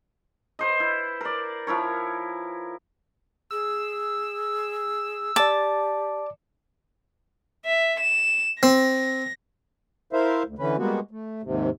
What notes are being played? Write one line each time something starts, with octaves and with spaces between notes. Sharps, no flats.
B4 C5 D#5
E4
A#4 D5
F3 E4 A#4 C#5
G#4 E6
G4 D5 A5 D6
E5
E7
C4 A#6
E4 A#4 C5 E5 F5
D2
D3 E3 C#4 B4
G3 G#3 A#3 B3 F#4
A3
D#2 G#2 C3